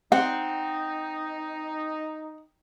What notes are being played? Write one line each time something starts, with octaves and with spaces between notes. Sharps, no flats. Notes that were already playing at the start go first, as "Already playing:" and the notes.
C4 D#4 F#5